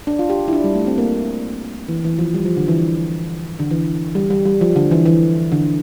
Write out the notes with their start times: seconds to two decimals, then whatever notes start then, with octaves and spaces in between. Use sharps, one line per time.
0.07 D4
0.19 F4
0.30 G4
0.48 E4
0.53 D4
0.64 G3
0.75 A3
0.87 C4
0.98 A#3
1.89 E3
2.04 E3
2.19 F3
2.34 G3
2.46 F3
2.57 D3
2.68 E3
3.59 D3
3.71 E3
4.15 G3
4.30 G3
4.45 G3
4.61 F3
4.76 D3
4.91 E3
5.06 E3
5.52 D3